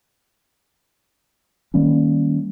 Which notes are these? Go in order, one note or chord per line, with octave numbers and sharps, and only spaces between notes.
D#3 G3 A#3 C#4